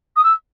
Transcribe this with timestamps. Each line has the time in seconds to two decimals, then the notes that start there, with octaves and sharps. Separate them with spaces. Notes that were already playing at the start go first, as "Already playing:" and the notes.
0.15 D#6
0.23 E6